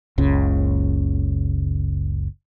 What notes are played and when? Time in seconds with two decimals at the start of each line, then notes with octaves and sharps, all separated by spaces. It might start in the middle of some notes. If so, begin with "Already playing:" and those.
0.18 F#1 C#2 C#3